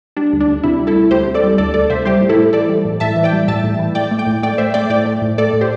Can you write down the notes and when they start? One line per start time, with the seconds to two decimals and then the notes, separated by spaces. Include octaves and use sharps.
0.16 G3 D4
0.33 D2
0.40 D4
0.48 D2
0.63 C3 E4
0.80 G3
0.87 E4 A4
0.95 D2
1.11 D2 G4 C5
1.27 C3
1.34 A4 D5
1.43 G3
1.58 D2 A4 D5
1.74 D2 A4 D5
1.90 C3 C5 E5
2.05 G3 G4 C5
2.21 A2
2.29 E4 A4
2.38 A2
2.53 E3 A4 D5
2.69 G3
2.85 A2
3.00 A2 E5 A5
3.16 E3
3.24 D5 G5
3.33 G3
3.48 A2 E5 A5
3.64 A2
3.79 E3
3.95 A2 D5 G5
4.11 A3
4.19 D5 G5
4.27 A2
4.43 A3 D5 G5
4.58 A2 C5 E5
4.74 A3 D5 G5
4.90 A2 D5 G5
5.05 A3
5.22 A2
5.38 A3 A4 D5
5.53 A2
5.61 G4 C5